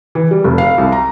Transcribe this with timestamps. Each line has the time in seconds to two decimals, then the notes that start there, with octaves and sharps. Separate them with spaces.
0.15 E3
0.31 G3
0.44 F1
0.58 F5
0.78 C2
0.92 A#5